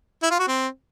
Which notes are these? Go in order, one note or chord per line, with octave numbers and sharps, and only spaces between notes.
E4
F4
F#4
C4